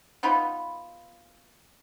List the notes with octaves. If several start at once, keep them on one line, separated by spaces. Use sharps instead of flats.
B3 D#4 F4 B5